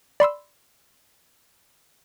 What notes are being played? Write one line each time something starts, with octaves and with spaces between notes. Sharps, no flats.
D5 B5 C6 E6